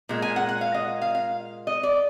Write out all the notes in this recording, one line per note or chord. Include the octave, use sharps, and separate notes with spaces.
A#2 G#3
G#5
F#5
F#5
F5
D#5
F5
F5
D#5
D5